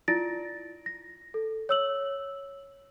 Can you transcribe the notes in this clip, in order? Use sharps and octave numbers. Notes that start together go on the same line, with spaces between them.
E4 F4 D5 A6 A#6 D7
A#6
A4
C#5 E6 F#7